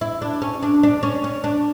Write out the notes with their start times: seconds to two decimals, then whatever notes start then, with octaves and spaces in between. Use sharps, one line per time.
0.01 E4
0.22 D4
0.42 C#4
0.63 D4
0.83 D4
1.03 C#4
1.24 C#4
1.44 D4